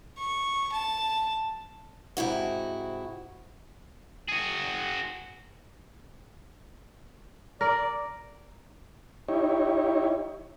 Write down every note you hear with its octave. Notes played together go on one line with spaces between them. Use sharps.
C#6
A5
G#2 C3 E4 F#4
F#4 G#4
A#4 D5
D#4 E4 G4 C#5